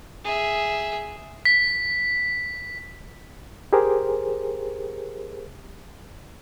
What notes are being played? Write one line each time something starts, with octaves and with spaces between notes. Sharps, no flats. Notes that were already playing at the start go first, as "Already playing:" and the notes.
G#4 E5
B6
G4 G#4 A#4 C5